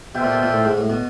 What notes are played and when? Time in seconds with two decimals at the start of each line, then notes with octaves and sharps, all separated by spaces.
0.15 B2 F4 A4 C5 E5 G5
0.24 A#2
0.34 B2
0.43 A#2
0.53 A2
0.65 G#2
0.78 A2
0.90 B2